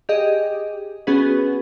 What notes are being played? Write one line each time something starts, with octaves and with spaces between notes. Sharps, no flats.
G4 G#4 D#5
B3 C#4 F#4 G#4 B4